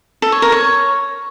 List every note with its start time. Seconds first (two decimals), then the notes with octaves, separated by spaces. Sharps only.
0.22 A4
0.32 C#5
0.42 A#4
0.52 C#5